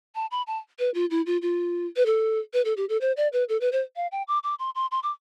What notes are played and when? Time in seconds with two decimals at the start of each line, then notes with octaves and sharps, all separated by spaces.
0.15 A5
0.31 B5
0.47 A5
0.79 B4
0.94 F4
1.11 E4
1.26 F4
1.42 F4
1.96 B4
2.06 A4
2.53 B4
2.65 A4
2.77 G4
2.89 A4
3.01 C5
3.17 D5
3.33 B4
3.49 A4
3.61 B4
3.72 C5
3.96 F5
4.12 G5
4.28 D6
4.44 D6
4.59 C6
4.75 C6
4.91 C6
5.03 D6